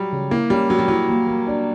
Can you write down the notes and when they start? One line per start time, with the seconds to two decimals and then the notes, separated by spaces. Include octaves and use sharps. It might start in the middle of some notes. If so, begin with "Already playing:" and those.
Already playing: F#3 G3
0.12 C#3
0.31 A#3 E4
0.50 G3 C#4
0.70 F#3 C#4
0.79 G3
0.88 F#3 E4
1.08 A#3
1.27 A#3
1.47 D4